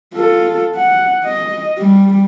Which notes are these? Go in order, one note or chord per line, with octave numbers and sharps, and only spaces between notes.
F4 A4
F#5
D#5
G3